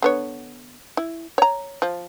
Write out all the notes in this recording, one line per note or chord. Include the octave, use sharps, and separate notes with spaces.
D3 B3 C#5
E4
C#5 A#5
F3